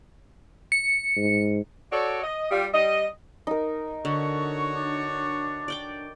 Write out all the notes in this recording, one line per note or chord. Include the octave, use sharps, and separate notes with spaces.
C#7
G#2
F#4 A4 C#5 D5
D#5
G3 F4
G3 D#5
D#4 A#4
D3 F#4 C#5 C#6
D4
D5 G5 D6